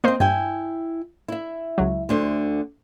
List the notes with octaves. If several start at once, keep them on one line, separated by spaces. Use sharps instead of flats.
A#3 C4 C5 D#5
G2 E4 G5 G#5
E4 E5
C#2 F#3
D2 D3 C5